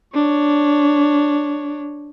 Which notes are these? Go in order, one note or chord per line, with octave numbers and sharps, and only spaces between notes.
D4 C#5